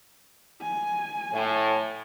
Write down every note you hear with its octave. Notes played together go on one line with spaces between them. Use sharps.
G#5
A2